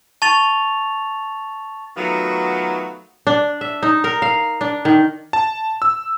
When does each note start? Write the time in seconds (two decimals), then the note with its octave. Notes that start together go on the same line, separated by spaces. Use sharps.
0.22 A5 C#6 A6 F7
1.96 D#3 F#3 A3 B3 F4 F#4
3.27 D4
3.61 E5
3.83 D#4
4.04 A#4
4.22 F5
4.61 D4
4.85 D#3
5.33 A5
5.82 E6